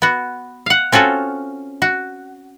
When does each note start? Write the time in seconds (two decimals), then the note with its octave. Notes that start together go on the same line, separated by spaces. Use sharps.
0.02 B3 F#4
0.66 F5 F#5
0.92 C4 C#4 F4 F#4 A4
1.82 F#4